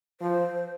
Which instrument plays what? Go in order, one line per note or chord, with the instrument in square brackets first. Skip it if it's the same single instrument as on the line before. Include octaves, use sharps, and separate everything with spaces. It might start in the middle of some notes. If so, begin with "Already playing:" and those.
[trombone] F3 [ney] C5